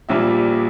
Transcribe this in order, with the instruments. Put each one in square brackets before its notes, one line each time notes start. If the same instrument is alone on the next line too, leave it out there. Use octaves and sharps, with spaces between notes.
[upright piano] A#1 A#2 G3 E5